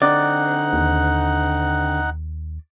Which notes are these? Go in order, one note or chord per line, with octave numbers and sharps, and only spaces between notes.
D3 C4 D#4 D5 F#5 F#6
D#2